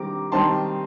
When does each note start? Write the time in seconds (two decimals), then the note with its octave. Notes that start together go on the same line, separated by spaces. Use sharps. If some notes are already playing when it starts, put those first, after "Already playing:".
Already playing: D#3 G3 C4 A#5 D6
0.32 D#3 G3 C4 D#4 A5 C6